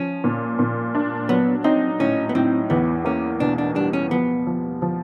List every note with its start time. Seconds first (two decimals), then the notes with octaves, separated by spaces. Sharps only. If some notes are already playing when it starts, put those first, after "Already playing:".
Already playing: F3 C#4
0.24 A#2
0.59 A#2
0.95 D4
1.29 F#3 B3
1.64 C4 D#4
2.00 A2 C#4
2.29 B3
2.35 A2 C4
2.70 E2 B3
3.05 A#3 C#4
3.40 B2 D4
3.58 D4
3.75 G3 D4
3.93 C#4
4.11 F3 B3
4.47 F3
4.82 F3